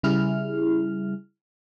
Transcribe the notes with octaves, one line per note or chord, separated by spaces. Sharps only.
C#3 G3 E4 G#4 F6